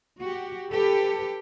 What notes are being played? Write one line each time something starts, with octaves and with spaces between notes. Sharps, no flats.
F#4 G4
G4 A4 B4